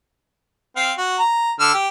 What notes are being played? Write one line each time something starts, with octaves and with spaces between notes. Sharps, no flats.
C4 F5
F#4
A#5
D3 E6 F6
G4